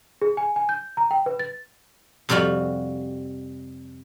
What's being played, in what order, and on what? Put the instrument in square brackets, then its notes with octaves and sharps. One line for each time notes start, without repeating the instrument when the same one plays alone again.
[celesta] G#4
G#5
G#5
G6
A#5
G5
B4
A6
[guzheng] F2 C3 G3 F4 F#4